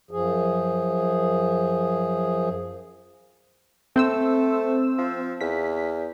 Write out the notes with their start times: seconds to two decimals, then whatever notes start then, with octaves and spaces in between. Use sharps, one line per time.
0.11 F#2 F3 G#4
3.96 A3 C4 C5 E6
4.98 F3
5.41 E2 B6